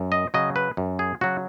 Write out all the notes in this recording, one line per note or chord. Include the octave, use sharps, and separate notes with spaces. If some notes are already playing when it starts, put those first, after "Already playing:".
Already playing: F#2
D#5
C#3 F#3 D#5
B4
F#2
G#4
C#3 F#3 F#4